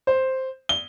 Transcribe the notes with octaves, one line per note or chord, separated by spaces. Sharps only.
C5
G7